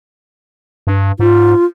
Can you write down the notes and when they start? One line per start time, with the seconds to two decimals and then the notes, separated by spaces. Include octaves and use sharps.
0.87 G2
1.19 G#2 F4